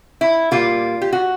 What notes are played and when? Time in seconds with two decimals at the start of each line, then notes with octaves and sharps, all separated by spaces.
0.21 E4
0.51 A#2 G3 A#3 F4
1.01 G4
1.12 F#4